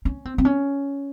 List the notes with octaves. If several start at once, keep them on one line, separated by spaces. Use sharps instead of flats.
C#4
C4
C4
C#4